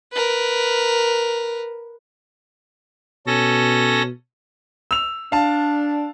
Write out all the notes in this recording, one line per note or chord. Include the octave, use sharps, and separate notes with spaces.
A#4 B4
B2 C#4 A4 A#6
E6 F7
D4 F5 A5